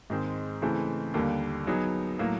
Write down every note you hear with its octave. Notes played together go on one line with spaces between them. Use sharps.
G#2 D#3 G#3 C4
C#3 E3 A3 C4
D#2 D3 G3 A#3
F#3 B3 D#4 G#4
A2 F#3 A#3